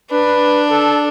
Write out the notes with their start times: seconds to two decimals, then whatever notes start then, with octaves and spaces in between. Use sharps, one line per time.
0.11 D4 B4
0.70 A4